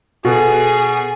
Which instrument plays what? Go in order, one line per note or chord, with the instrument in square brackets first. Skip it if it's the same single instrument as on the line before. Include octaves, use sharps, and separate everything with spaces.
[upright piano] B2 [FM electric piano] F#4 A4 [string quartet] G#4